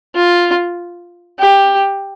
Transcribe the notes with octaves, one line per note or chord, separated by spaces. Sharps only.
F4
G4